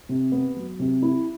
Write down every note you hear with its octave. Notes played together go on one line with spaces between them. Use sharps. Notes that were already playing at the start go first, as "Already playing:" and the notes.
C3
B3
F#3
C3
E4